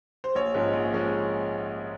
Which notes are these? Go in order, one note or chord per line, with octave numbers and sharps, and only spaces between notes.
C5
A#1 C#5
G#2 F3 G#3 C#4
A#1
F3 G#3 C#4